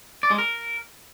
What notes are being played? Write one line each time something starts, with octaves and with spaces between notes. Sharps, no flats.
D5
G#3
A#4